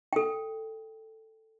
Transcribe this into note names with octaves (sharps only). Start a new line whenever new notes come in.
A4 G5